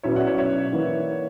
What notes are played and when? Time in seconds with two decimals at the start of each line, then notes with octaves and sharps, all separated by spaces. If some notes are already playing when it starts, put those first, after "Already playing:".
0.03 B2 F#3 C#4 E4 C#5 E5
0.15 D5 F#5
0.27 C#5 E5
0.38 C#5 E5
0.73 E3 A#3 E4